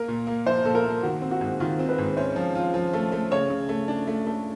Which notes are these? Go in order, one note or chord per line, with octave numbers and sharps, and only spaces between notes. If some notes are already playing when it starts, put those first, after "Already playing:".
Already playing: A#3 A#4
A#2
A#3
F3 C5
A#2 A4
A#4
A#3
D#3 F#4
C4
F#4
G#2
D#3 F4
C4
B4
G#2
C#4 C5
F3
F4
F3
A3
A3
C#3 C#5
C#3
A3
D4
A3
A3